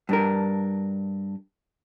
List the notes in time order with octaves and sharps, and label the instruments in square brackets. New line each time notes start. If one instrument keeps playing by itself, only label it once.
[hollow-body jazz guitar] G2 D4 A#4